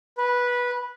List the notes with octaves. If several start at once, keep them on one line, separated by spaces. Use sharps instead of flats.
B4